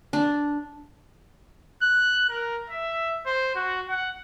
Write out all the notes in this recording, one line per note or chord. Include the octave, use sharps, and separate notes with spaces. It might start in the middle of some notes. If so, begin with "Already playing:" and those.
D4
F#6
A#4
E5
C5
F#4
F#5